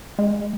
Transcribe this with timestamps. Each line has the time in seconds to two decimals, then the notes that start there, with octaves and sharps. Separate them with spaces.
0.19 G#3